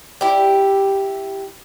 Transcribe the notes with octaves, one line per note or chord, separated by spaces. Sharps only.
E4 G4